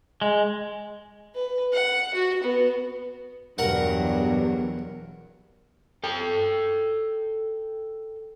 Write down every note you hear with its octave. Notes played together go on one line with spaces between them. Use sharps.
G#3
B4
F#5
F#4
B3
E2 G2 B2 F#3 A#4 F#5
A4 G5